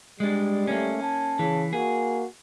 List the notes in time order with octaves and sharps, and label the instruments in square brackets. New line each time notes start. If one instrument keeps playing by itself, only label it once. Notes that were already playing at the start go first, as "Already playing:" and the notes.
[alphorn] G3 [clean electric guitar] G#3 D4
[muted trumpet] A3 [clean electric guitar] A#3 C#4
[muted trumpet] A5
[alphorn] C#3 [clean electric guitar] E3
[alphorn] A#3 [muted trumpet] F#4 [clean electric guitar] G#4